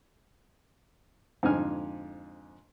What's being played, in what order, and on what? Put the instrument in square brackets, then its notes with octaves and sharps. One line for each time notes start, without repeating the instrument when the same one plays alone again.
[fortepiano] F2 G#2 D3 G#5 F6